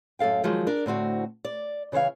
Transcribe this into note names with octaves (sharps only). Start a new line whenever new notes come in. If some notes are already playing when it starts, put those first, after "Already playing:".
F#2 A2 A4 F5 G5
D#3 F3 F#3 G#3
D4 A#4 D5
A2 D3 C4 F#4
D5
C#3 E3 C5 C#5 F5